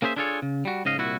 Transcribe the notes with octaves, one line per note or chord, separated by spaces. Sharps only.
A#3 C#4 G#4 C5 E5
D4 E4 F4 G#4 A4 C#5
C#3
G3 F#4
G#2 C#3 D#5 F5
C2 A#2 E4 F#4